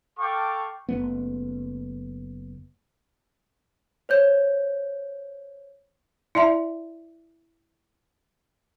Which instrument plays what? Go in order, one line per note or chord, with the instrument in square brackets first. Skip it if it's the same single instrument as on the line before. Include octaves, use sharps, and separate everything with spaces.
[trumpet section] A4 F5 G5 A5 C#6 D6
[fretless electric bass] F#1 A3 B3
[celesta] C5 C#5 G6
[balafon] E4 D5 E5 A#5